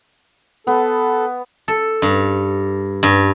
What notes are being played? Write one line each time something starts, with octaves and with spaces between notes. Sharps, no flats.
B3 A4
A4
G2
G2